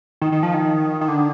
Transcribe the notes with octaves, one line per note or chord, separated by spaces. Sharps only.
D#3
D#3
F3
D#3
D#3
D3